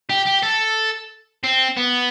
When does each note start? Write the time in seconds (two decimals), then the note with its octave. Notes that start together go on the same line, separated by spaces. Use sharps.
0.10 G4
0.27 G4
0.44 A4
1.44 C4
1.77 B3